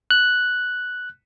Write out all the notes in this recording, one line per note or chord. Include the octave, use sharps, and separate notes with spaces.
F#6